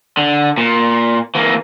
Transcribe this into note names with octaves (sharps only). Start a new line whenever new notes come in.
D3
A#2
E3 A#3